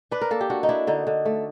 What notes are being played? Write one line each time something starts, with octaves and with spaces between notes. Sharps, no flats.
D4 B4
A#4
A#3 A4
G4
D4 F#4
D#4
D4 E4
D3 D#4
D3
A3